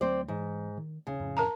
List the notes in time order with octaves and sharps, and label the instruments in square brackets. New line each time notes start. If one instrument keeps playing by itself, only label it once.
[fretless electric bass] D2 F#3 A3 [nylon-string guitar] C4 C5 D5
[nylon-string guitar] G#2 [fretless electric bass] E3
[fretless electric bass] D#3
[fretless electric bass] D#1 [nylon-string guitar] C#3
[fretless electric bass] F2 A2
[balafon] A#4 A5 A#5